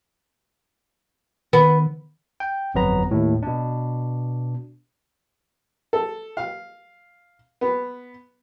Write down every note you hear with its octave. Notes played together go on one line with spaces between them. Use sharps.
D#3 B3
G5
G1 F2 F#3 B3 B4 A#5
D#2 A2
B2 D4
A4
F5
B3